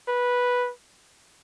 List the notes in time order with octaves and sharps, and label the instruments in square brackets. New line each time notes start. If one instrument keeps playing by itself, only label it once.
[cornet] B4